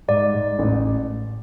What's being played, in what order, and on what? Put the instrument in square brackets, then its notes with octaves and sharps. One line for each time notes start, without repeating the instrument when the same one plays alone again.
[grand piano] G#2 [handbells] D5
[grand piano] G#2
A1